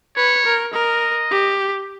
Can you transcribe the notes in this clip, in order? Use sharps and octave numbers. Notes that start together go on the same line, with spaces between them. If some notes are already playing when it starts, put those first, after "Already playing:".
B4 C#5
A#4
A#4 D#5
G4